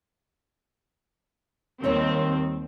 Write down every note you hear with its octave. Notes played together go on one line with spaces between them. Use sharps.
D#2 D#3 G3 C4 G4 C#5